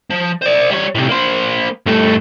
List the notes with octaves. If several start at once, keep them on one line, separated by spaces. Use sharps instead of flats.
F3
C5 D5
G3 C#5
A2 C3
A#3 C5
G2 A3